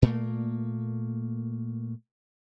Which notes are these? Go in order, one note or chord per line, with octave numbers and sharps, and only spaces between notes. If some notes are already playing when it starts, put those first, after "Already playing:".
A#2 A3 A#3